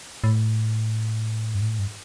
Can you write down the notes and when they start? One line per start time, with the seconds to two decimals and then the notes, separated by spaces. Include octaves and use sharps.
0.24 A2
1.55 G2
1.61 A2
1.79 G2